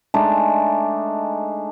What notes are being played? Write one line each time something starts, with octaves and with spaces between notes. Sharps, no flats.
G#3 A3 D4 D#4